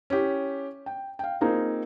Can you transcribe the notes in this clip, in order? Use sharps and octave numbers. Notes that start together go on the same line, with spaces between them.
C#4 E4 G4
G5
F5 G5
A#3 C4 D#4 F4 G#4